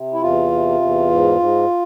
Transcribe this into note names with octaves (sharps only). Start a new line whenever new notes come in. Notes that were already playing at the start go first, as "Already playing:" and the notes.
Already playing: C3
E4
E2 F4
C3
E2
G#2
G#2